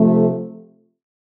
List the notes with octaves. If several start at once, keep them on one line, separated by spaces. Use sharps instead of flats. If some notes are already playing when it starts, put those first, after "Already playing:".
Already playing: C3 F3 A3